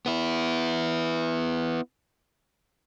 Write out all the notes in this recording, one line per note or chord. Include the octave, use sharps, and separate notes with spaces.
B3 E4